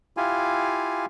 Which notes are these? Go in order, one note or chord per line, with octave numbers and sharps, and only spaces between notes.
E4 F4 G4 F5 G#5